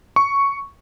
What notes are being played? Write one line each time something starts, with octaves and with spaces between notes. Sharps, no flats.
C#6